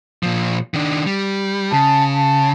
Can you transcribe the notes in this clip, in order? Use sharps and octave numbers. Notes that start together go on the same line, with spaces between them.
A#2 F3
D#3 D4
G3
C#3 A5
A5